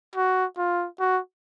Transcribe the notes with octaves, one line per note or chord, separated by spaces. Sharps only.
F#4
F4
F#4